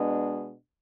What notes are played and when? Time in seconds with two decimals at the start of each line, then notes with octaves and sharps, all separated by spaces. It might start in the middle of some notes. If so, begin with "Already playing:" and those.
Already playing: B2 G#3 B3 D4